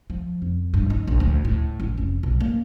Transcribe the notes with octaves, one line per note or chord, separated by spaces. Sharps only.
F3
F2
G2
D#4
A#1
D2
A2
A1
F1
B1
A#3